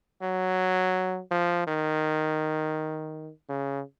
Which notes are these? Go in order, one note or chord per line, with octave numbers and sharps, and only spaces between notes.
F#3
F3
D#3
C#3